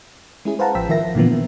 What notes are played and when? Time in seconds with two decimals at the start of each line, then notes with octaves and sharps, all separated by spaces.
0.45 G#3 C#4 E4 G#4
0.59 B4 C5 F5 F#5 A5 A#5
0.75 A1 F3 G5 E6 B6
0.89 D#3 F3 A#4 E5 A#6
1.15 A#2 D3 E3 F3 A#3 B3
1.33 D#3